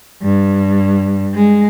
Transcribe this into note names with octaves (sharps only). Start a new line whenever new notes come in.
G2
G#3